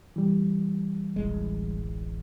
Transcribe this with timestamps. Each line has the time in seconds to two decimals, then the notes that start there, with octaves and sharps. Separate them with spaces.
0.16 E3 G3
1.16 D1 A1 G#3